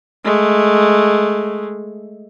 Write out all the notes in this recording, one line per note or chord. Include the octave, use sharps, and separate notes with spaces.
G#3 A3